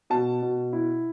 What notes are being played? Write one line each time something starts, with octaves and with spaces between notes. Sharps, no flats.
B2 A5
B2
E4